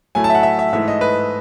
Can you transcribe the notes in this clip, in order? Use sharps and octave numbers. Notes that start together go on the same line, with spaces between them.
A2 F#3 A3 G#5
A5
E5
F#5
E5
E5
G#2 E3 A3 E5
D#5
B4